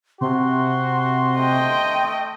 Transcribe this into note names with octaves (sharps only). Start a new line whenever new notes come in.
C3 F#4 C6
A3 D#5 G5